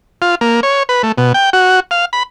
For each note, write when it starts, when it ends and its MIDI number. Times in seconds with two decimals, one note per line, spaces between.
0.22 0.35 65
0.41 0.60 58
0.63 0.83 73
0.89 1.02 71
1.03 1.12 57
1.18 1.33 47
1.34 1.50 79
1.53 1.80 66
1.91 2.05 77
2.13 2.23 83